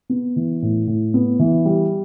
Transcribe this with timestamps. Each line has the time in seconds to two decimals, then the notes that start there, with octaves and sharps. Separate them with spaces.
0.09 B3
0.36 E3
0.62 A2
0.87 A2
1.14 B3
1.39 E3
1.65 G3